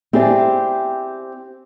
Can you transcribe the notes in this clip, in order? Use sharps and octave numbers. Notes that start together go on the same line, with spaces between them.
C4 E4 G4 G#4 C5 D5